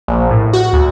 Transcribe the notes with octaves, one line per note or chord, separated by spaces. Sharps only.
A#1
A2
F#4
D2